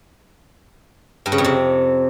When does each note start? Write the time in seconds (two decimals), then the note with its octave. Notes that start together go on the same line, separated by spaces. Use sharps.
1.26 G2
1.32 C#3
1.38 F2
1.44 C3